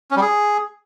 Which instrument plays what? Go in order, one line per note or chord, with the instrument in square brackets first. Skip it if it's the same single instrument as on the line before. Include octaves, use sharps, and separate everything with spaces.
[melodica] C#4
G3
G#4